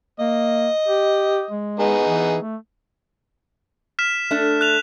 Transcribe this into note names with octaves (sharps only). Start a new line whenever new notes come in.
A#3 D#5
G4
G#3
B3 D#4 G#4
E3
A3
F6 B6 E7
A3 D4 A4
F#6 F7